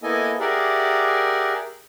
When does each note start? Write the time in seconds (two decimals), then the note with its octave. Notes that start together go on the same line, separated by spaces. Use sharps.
0.03 A#3 B3 E4 A4 D#5 G#5
0.40 G4 G#4 A#4 D5 E5 F#5